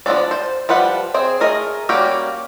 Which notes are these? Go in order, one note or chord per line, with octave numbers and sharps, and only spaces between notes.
F3 B3 C4 D4 D5
C5
F3 G3 B4 F#5
C4 G#4 C5
A3 G#4 A#4 D#5
G3 A#3 C#4 F#4 G4